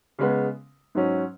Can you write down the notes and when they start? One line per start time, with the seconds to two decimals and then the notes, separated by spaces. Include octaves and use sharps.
0.19 C#3 G#3 B3
0.95 G#2 F#3 C#4